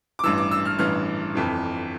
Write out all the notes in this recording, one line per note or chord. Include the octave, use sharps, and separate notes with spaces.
D6
A1 G2 E3 E6
D6
E6
F6
A1 G2 E3 F6
G1 F2 E3